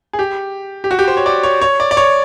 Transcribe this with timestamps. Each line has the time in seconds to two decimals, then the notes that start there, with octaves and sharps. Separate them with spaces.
0.13 G#4
0.19 G4
0.84 G4
0.91 F#4
0.99 G4
1.08 C5
1.17 C#5
1.26 D5
1.43 C#5
1.61 C#5
1.80 D5
1.91 D5
1.97 C#5